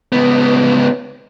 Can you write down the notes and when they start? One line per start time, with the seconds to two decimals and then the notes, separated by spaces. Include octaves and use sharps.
0.12 C#2 B3